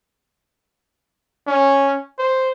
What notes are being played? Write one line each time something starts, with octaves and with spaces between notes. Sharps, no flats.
C#4
C5